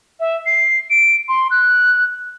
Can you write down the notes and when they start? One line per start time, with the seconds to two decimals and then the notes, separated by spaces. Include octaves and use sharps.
0.19 E5
0.46 C7
0.90 D7
1.28 C6
1.50 F#6